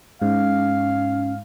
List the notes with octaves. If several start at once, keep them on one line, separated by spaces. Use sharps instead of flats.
G#2 C#4 F5